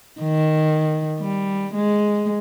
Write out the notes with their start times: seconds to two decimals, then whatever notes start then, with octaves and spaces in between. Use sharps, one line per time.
0.21 D#3
1.18 G3
1.74 G#3